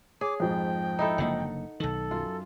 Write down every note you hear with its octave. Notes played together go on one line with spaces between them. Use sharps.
G#4 C#5 D6
F2 G#2 F3 G5
D#4 E4 A4
F#1 D3 A#3 D#4 F#5
B1 D#3 A4 F#7
F#2 F4